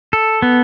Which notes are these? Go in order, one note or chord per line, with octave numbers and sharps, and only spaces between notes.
A4
B3